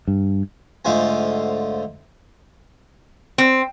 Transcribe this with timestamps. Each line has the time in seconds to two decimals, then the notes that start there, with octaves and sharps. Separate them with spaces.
0.07 G2
0.85 G#2 D3 A3 F4 C5 G#5
3.38 C4